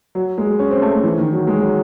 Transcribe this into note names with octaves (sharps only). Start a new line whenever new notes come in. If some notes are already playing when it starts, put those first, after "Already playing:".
F#3
G#3
C#4
C4
A3
A3
E3
D#3
F#3
G#3
F#3